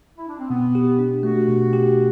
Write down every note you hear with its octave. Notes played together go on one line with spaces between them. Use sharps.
E4
D4
C4
B2 B3
G4
D4
A3 F#4
B2
G4